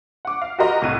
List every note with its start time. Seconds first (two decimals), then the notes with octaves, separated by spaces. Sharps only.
0.25 F#5 D6
0.41 F5
0.59 F#4 G4 A#4 D#5 A#5
0.82 C2 A2 D#7